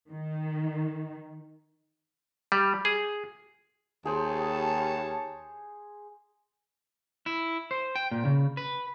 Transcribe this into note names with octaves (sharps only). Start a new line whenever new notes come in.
D#3
G3
G#4
D#2 G4 G#4 C5 C#5 A5
E4
C5
G5
A#2
C#3
B4